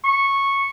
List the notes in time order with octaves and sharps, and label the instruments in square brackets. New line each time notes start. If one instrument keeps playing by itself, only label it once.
[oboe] C#6